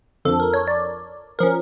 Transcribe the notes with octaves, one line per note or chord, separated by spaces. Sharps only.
F2 D3 F3 A4
A#4
C#5
D5
F3 C#4 A#4